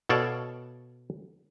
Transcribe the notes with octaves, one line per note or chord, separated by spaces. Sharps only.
B2 A4 C#5 D5 F5